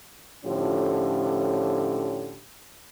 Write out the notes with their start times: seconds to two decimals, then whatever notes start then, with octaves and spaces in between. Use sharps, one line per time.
0.45 A2 D3 F3 C#4 F4 G4